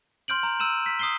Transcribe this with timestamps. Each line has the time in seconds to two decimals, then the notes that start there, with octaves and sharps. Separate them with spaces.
0.28 C6 F6 G6 D7 F#7
0.43 A#5
0.59 E6 D#7 E7 F#7
0.86 B6
0.99 D#6 C7 G7